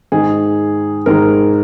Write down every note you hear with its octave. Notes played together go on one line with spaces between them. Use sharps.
G#2 D#3 G#3 G#4
G#2 D#3 G#3 A#4